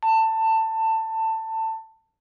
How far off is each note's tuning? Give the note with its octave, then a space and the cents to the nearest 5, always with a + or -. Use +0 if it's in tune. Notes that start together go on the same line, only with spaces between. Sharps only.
A5 +20